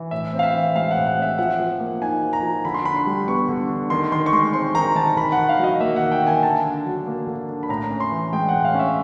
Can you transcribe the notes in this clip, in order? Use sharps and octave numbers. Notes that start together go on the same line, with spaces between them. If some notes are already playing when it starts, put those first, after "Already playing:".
Already playing: E3
A2 E5
C4
F5
E5
E3
G#3 F5
F#5
A2
F#5
C4
E5
F3 F#5
F3
A#3
D#4 G#5
F3
A#5
F3
D3 B5
C6
D4 B5
C6
G3
B3 C#6
D3
D4
D#3 C6
D#3 C6
C#6
G#3 C6
C4 C6
D#3 A#5
D#3 A5
D#3 B5
F#5
D#3
F5
F#3 D#5
A#3 E5
D#3 F#5
G5
D#3 G#5
D3 A5
D4
F#3
A#3
D3
D4
B5
A2 A#5
C#4
C6
E3
G#3 G5
A2 F#5
F5
C#4
E5